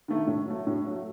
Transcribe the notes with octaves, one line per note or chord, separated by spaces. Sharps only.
D#3 A3
A2
F#3 A3
A2
F#3 A3